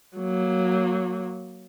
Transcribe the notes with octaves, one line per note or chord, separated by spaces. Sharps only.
F#3 A#3